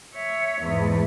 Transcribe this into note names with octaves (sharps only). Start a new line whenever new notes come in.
C#5 E5
E2 G#2